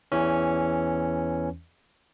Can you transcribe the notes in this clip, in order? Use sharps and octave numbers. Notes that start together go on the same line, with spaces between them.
E2 E3 C#4